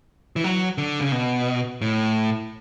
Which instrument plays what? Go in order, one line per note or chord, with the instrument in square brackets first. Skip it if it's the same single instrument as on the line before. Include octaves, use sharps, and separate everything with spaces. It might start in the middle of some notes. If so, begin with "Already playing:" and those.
[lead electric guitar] E3
F#3
D3
C#3
B2
A2